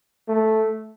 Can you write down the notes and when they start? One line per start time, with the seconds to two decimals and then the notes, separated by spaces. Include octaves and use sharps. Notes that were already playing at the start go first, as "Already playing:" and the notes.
0.29 A3